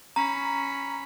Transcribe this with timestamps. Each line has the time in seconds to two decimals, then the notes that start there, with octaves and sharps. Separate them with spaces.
0.16 C#4 A#5 B5